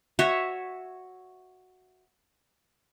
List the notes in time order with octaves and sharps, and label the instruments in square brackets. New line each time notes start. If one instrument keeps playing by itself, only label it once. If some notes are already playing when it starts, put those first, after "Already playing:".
[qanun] F#4 C#5 E5